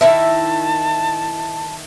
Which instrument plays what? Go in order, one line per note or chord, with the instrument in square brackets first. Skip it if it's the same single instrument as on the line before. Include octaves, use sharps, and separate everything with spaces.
[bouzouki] D#3 E4 E5 [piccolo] A5